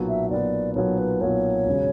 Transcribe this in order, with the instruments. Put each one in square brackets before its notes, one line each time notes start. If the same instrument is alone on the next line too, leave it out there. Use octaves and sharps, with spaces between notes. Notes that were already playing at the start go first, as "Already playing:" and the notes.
Already playing: [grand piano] B1 A#2 F#3 B3
[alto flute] E5
[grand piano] B1 A#2 F#3 B3 [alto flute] D5
[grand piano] B1 A#2 F#3 B3 [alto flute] C#5
[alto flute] B4
[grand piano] B1 A#2 F#3 B3 [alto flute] C#5
[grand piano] E1 C#3